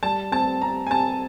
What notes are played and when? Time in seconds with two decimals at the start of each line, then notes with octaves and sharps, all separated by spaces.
0.03 G3 A5
0.31 C4 A5
0.61 C4 A#5
0.87 G#5
0.90 C4 A5